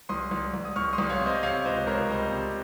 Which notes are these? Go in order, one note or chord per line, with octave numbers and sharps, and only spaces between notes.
C2 C6 D#6
C2
C2
D#6
C2 C#6 F6
C6 D#6
C2
C#5 F5
C3
C5 D#5
C3 C#5 F5
C#2 C5 D#5
C#2 A#4 C#5
G3 C5 D#5
C3